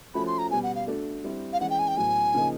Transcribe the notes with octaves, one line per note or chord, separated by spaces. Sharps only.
F3 A3 C#4 F#4 B5
C6
A#5
B2 G3 B3 G#5
F#5
F5
A3 D4 F#4 A4
G3 C4 E4
F5
E3 G#3 C#4 F#5
G5
G#5
G5
A2 F#3 B3 G#5
C#3 F3 A#3 D#4